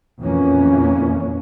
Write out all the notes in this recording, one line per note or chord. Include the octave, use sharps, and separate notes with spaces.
F2 A#2 E3 A#3 C#4